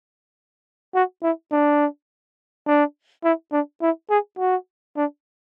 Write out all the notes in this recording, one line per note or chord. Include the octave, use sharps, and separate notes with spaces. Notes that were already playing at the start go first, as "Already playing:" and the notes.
F#4
E4
D4
D4
E4
D4
E4
G#4
F#4
D4